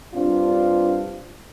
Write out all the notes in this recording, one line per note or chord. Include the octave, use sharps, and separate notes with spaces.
G2 C4 D4 F4